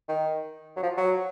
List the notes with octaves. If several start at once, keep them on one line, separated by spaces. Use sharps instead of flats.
D#3
F#3
F3
F#3